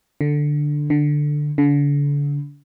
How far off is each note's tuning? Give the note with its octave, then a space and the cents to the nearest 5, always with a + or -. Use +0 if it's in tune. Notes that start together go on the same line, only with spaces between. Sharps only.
D3 +5
D3 +10
D3 -35